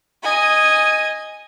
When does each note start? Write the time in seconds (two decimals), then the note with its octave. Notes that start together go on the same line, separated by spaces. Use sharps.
0.22 D#5 G#5